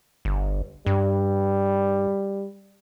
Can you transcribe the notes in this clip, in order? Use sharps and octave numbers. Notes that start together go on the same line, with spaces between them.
G1
G2 G3